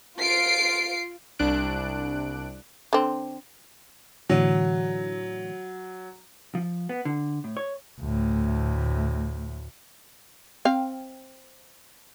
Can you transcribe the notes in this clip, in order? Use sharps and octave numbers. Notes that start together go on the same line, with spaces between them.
F4 C7 D7
C2 D4 F#6 D7
D3 C4
A2 D3 E3 F#3
F3
B3
D3
A2
C#5
D2 A2
C4 F5 G5